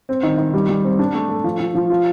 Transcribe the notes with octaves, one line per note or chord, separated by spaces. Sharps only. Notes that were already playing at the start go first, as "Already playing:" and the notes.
C4
D#3
D#3
G3
G3
C4
D4
A3
A4
F3
F3
F3
F4